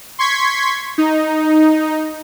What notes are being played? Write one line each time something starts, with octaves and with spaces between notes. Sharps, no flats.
C6 C#6 G#6 B6
D#4